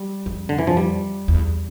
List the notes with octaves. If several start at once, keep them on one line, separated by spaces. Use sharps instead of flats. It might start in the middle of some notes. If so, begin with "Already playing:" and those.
Already playing: G3
F2
D3
E3
F3
G3
E2